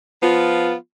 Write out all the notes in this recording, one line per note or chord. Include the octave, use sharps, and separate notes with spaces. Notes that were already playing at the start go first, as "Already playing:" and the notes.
F3 B3 F4